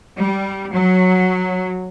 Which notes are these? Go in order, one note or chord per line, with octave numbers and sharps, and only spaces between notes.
G3
F#3